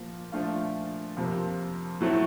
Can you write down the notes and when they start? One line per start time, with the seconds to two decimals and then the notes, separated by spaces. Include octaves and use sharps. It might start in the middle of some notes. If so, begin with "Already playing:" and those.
Already playing: A#2 F3 A#3
0.32 A#2 F3 A3 D4 F4
1.17 F2 C3 F3 A#3
2.00 A2 F#3 A3 C4